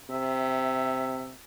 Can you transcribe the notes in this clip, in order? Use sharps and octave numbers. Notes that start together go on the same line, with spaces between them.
C3 E5